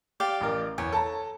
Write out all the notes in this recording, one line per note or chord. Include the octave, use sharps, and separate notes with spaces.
G4 D5 F5
A1 A#4
E2 C#5
A4 A5 A#5